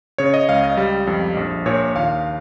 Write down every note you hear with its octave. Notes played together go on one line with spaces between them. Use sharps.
C#3 C#5
D#5
C#2 F5
D#5
G3
F2
A#1
A#2 C#5
D#2 F5